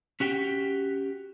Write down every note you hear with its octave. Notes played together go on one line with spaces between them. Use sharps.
C#4 F#4 G4 G5